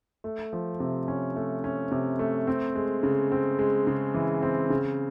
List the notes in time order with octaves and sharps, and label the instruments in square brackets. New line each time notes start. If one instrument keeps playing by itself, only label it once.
[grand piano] A3
F3
C3
C#4
A3
C#4
C3
A3
C4
G#3
C#3
C4
G#3
C#3
E3
C4
C#3